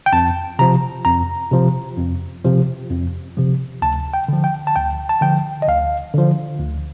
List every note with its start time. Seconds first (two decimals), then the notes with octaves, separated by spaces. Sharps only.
0.06 G5
0.13 F2 A5
0.59 C3 F3 A#5
1.05 F2 A#5
1.51 C3 F3
1.97 F2
2.44 C3 F3
2.90 F2
3.37 C3 F3
3.82 D2 A5
4.14 G5
4.28 D3 F3
4.44 G5
4.67 A5
4.76 D2 G5
5.09 A5
5.21 D3 F3 G5
5.62 D#5
5.67 D2 F5
6.14 D3 F3
6.60 D2